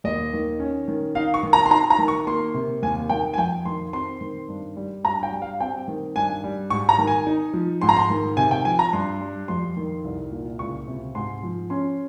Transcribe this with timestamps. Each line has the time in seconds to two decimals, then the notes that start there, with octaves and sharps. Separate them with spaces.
0.04 D#2 D#5
0.33 D#3
0.60 C#4
0.88 D#3
1.15 D#4 F5
1.34 C#6
1.43 D#3
1.53 A#5
1.66 C6
1.71 D#4 A#5
1.90 A#5
1.98 D#3
2.08 C#6
2.27 A#3 C6
2.54 C3
2.83 D#2 G#5
3.09 D#3 G5
3.34 G#5
3.38 F2 G5
3.65 D#3 C6
3.93 C4 C6
4.21 D#3
4.48 G2
4.77 G3
5.04 G2 A#5
5.23 G5
5.32 G3
5.42 F5
5.60 C4 G5
5.88 D#3
6.16 G2 G#5
6.44 G3
6.70 G#2 C#6
6.89 A#5
6.98 D#3
7.07 G#5
7.27 D#4
7.54 F3
7.81 G#2 C6
7.89 A#5
7.97 C6
8.10 D#3
8.37 C3 G#5
8.51 G5
8.65 F3 G#5
8.79 A#5
8.92 G2 C6
9.21 G3
9.48 F2 C6
9.77 D#3
10.05 C2
10.31 A#2
10.59 C#2 C#6
10.88 C3
11.15 G#2 C6
11.43 F3
11.70 C#4 C6